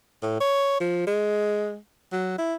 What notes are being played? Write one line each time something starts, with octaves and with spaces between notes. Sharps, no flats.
A2
C#5
F3
G#3
F#3
E4